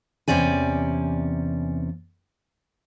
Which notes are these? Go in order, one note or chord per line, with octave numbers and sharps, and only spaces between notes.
E2 C3 C#4 D5 G#5